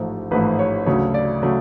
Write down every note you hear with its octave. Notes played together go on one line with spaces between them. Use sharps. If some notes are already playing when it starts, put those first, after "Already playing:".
Already playing: A1 G#2 F3 A3
A1 G#2 F3 A3 B4
C#5
D2 C#3 F#3 A3 C#5
D5
C#3 F#3 A3